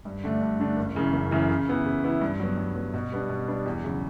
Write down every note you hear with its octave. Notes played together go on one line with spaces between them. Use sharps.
G2
D3 A3 D4
G2
D3 A3 D4
F#1
F#2 C#3 E3
F#1
F#2 C#3 E3
C#3
E3 B3 E4
C#3
E3 B3 E4
G2
F#3 B3
G2
F#3 B3
B2
G3 B3 D4
B2
G3 B3 D4
E2
C#3 F#3